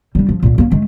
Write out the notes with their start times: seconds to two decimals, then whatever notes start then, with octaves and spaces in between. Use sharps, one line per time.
0.15 G3 D4
0.29 F3
0.43 D2 A#2
0.58 A#3 C#4
0.72 G#3 A3